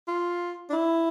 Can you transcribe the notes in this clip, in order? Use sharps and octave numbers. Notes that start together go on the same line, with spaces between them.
F4
D4
E4